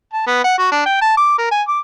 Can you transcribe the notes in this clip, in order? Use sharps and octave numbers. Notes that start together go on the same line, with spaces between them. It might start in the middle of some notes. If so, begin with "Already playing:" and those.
A5
B3
F#5
F#4
D4
G5
A5
D6
A#4
G#5
D6